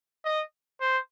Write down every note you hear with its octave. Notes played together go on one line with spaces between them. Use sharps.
D#5
C5